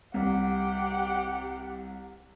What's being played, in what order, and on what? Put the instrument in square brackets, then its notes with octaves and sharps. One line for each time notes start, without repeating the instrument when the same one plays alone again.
[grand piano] C2 [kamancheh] G4 F#5